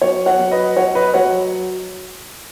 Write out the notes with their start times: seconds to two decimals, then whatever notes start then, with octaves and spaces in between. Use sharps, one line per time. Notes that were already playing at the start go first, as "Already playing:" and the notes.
0.02 F#3 C#5
0.26 C#5 F#5
0.39 F#3
0.52 B4 D#5
0.76 F#3 C#5 F#5
0.95 B4 D#5
1.14 F#3 C#5 F#5